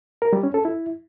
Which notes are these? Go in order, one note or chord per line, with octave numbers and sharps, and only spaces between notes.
A#4
G3
C#4
A4
E4